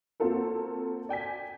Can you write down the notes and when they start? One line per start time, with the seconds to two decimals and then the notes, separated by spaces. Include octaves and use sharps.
0.20 A#3 C4 F4 F#4 A4 A#4
1.09 D5 G5 G#5 B6